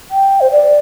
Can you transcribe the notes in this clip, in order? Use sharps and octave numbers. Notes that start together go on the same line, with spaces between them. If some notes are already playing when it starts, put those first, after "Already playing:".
G5
C5
D5